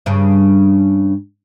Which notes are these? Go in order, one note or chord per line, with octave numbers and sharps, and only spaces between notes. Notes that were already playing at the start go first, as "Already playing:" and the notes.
G2 C#3